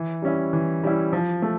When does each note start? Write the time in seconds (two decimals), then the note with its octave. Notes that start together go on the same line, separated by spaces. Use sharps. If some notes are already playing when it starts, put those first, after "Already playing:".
Already playing: E3
0.22 G3 C#4 E4
0.53 E3
0.83 G3 C#4 E4
1.13 F3
1.42 A3